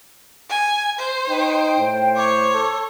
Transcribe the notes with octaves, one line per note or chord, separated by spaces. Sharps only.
G#5
C5
D#4 G5
A2 C5
C#5 D6
A4